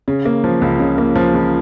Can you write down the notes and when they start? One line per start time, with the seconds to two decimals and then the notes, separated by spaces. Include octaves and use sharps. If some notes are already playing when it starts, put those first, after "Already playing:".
0.08 C#3
0.25 A#3
0.44 F3
0.61 C#2
0.80 C#3
0.98 A#3
1.16 F3
1.34 C#2